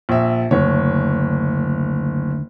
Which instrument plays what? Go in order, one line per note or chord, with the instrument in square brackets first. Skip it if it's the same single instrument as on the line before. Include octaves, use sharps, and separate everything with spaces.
[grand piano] A#1 E5
[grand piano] F#1 C#5 [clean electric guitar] D2